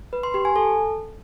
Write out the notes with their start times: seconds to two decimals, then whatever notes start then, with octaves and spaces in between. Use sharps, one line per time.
0.13 B4
0.23 C6
0.34 G4
0.45 G#5
0.56 A4